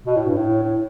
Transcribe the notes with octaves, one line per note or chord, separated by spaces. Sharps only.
B2
A2
G2
A2
A2